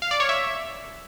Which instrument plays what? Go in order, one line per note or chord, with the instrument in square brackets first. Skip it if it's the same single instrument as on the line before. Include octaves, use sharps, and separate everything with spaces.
[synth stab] F5
D5
C#5
E5